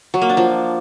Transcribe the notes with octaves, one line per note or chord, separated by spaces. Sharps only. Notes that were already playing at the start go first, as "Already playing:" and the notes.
F#3
A#3
D4
F3